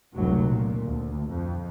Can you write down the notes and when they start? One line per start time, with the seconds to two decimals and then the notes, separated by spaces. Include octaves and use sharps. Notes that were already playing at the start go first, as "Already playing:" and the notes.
0.14 F1 C#2 A2 D3 F#3
0.46 A#2
0.85 D2
1.30 F2